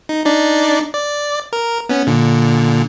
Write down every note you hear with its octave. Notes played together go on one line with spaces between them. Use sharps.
D#4
D4 D#4 D5
D5
A#4
B3 C#4
A#2 D3